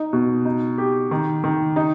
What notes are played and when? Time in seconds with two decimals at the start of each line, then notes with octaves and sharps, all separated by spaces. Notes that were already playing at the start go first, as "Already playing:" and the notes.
Already playing: D#4
0.13 B2
0.45 D#4
0.78 G4
1.11 D#3
1.44 D#3
1.76 D#4